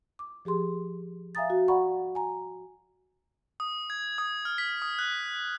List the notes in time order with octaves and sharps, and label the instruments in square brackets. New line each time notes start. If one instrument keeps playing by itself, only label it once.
[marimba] D6
F3 G4 G#4 C6
E5 F5 G#5 A#5 D#6 A6
F#4
D5 F#5 A#5 B5 C#6
G#5 A#5
[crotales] D#6
G#6
D#6
F6
B6
D#6
F#6